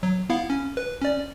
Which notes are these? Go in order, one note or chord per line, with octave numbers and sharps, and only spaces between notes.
F#3
B3 E4 F5
C#4
B4
C#4 D5